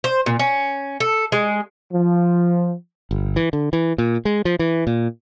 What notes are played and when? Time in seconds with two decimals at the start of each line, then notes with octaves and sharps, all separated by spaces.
0.04 C5
0.26 A#2
0.39 C#4
1.00 A4
1.32 G#3
1.93 F3
3.11 G1
3.36 E3
3.53 D3
3.73 E3
3.98 A#2
4.25 G#3
4.45 F3
4.59 E3
4.87 A#2